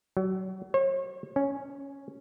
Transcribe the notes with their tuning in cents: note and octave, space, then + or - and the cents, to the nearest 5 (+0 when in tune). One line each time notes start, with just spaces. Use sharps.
F#3 +30
C#5 -45
C#4 +0